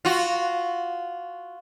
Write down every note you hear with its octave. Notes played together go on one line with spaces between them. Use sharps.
F4 F#4